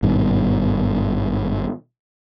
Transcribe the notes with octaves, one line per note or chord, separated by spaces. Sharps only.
G#1 G2 B2